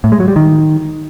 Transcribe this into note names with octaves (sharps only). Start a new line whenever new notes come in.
A2
G#3
F#3
G3
D#3